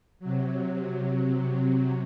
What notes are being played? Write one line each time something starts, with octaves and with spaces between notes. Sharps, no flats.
C3 F#3